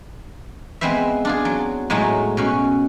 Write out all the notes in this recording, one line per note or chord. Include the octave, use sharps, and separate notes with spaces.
G#3 B3 C4 C5 E5
D4 F4 G#4
F#3
A2 F#3 G#3 A3 D#4
B2 C#4 F#4